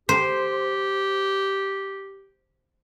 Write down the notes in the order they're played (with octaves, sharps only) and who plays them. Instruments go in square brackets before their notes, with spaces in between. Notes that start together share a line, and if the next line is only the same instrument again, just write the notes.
[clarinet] G4 [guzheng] C5